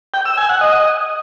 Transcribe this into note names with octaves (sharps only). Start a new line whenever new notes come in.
G5
E6
G#5
F#5
D#5